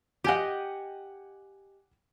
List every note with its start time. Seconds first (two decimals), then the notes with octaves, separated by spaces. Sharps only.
0.24 G4 D#5 F#5 G#5 D6